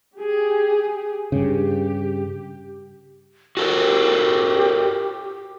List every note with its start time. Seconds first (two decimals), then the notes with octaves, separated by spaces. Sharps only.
0.17 G4 G#4
1.32 G2 C#3 G4
3.57 F#4 G4 A4 A#4